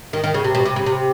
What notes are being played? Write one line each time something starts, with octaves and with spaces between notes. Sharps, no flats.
D#3
D#3
C#3
C3
B2
C3
C#3
C3